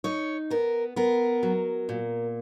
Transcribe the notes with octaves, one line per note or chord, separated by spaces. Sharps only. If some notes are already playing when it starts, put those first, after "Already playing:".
D#4 C#5
B3 A#4
B3 A#4
F#3
A#2